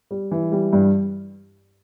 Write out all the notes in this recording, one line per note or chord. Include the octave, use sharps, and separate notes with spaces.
G3
E3
G3
G2